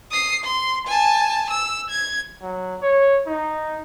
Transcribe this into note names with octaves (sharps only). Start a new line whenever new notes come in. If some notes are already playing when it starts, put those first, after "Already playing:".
D#6 C7
C6
G#5 A5
E6
G#6
F#3
C#5
D#4